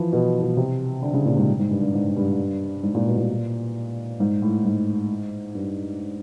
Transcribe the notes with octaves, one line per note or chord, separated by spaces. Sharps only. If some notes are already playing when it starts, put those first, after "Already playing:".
Already playing: E3 F3
B2
B2
C3
D3
C#3
A#2
G#2
G#2
G2
G2
G#2
G2
G#2
A#2
B2
A#2
G#2
A2
G#2
G2